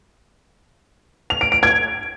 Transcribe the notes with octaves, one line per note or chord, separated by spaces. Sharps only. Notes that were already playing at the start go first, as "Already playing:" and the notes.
F7
D7
D7
G#6